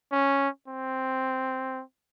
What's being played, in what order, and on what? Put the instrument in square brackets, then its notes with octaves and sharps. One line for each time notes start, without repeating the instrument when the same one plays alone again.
[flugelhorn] C#4
C4